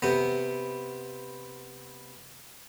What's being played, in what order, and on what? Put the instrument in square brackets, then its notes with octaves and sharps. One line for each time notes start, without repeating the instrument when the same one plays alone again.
[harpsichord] C3 B3